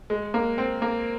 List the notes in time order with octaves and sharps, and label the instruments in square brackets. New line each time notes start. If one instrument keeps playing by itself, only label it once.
[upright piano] G#3
A#3
C4
A#3